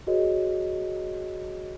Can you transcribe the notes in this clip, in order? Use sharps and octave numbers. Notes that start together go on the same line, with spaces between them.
F#4 G#4 A#4 C#5 D#5